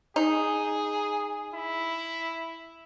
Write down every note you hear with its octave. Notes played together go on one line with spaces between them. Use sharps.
D#4 G#4
E4